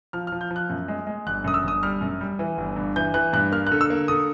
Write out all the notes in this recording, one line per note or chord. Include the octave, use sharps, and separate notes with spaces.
F3 F6
F3 F6
G6
F3
F#6
F#2
G#3
G#3
G1 F#6
F#2 D#6
E6
G1 D#6
G3 F6
F#2
G3
E3
G1
G2
E3 G6
E3 F#6
G2 F#6
A#3 F6
D3 F#6
E6
A#3
D3 D#6